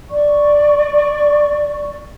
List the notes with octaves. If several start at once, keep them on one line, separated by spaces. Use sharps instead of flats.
D5 C#6